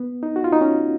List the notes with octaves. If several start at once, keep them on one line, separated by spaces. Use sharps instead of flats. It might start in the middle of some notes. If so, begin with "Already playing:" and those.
Already playing: B3
D#4
F#4
F4
D#4
C#4